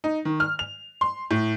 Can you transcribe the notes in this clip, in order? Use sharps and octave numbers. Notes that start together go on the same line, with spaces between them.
D#4
D#3
F6
F7
C6
A2